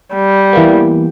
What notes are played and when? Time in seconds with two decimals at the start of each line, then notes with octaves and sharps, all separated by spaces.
0.14 G3
0.53 E3 A#3 B3